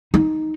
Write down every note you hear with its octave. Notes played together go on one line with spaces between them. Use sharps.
D#4